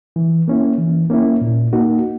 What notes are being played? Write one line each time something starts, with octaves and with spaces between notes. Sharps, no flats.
E3
A#3 C#4 E4
E3
A#3 C#4 E4
A#2
A#3 D#4 F#4